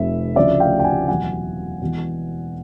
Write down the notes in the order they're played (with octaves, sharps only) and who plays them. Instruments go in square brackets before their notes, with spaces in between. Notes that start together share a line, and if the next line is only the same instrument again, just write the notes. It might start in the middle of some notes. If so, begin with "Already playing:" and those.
Already playing: [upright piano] F1 F2 C3 E5
D2 C#3 F3 D5 E5
F5 G5
G5
F#5 G#5
E2 B2 F#3 F#5 G#5
E1 E2 B2